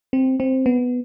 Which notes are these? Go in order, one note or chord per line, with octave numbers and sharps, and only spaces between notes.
C4
C4
B3